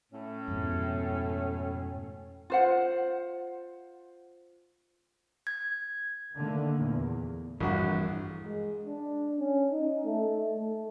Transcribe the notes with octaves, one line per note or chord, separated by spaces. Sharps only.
A2 C#4
F2 G#2 B2
F4 C5 F#5
G#6
D3 D#3 A3 A#3
E2 A#2
A#1 G2 E3 F#4
G#3
D4
C#4
D#4
A3
A3